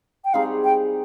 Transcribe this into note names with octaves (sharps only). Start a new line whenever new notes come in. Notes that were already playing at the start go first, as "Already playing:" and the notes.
G5
G3 C4 D#4 G#4 F5
G5